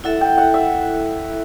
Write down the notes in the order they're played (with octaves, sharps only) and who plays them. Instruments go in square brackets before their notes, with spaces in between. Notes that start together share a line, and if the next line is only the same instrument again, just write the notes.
[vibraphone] E4 A4 E5 [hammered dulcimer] F#5
[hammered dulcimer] G5
F#5
E5